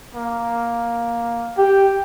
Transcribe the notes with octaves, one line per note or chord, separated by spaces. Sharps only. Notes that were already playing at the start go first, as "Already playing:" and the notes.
A#3
G4 G5